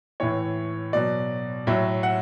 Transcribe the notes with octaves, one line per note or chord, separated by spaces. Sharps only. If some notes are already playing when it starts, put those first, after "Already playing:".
A2 E3 C#5
B2 F#3 D5
A2 F#3 E5
F#5